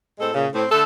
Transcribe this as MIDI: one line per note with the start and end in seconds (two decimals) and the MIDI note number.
0.19 0.32 45
0.19 0.32 56
0.19 0.32 60
0.19 0.32 69
0.33 0.46 46
0.33 0.46 49
0.52 0.65 45
0.52 0.65 60
0.70 0.83 50
0.70 0.83 57
0.70 0.83 69